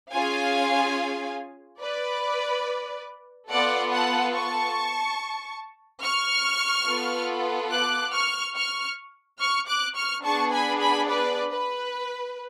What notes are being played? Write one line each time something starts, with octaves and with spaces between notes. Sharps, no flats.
C#4 F4 G#4 F5 G#5
B4 D5
B3 F4 A4 D5 F#5
F#5 A5
A5 C#6
C#6 F6
B3 F4 A4
D6 F#6
C#6 F6
C#6 F6
C#6 F6
D6 F#6
C#6 F6
B3 D4 G#4 A5 C#6
G#5 B5
G#5 B5
B4 D5
B4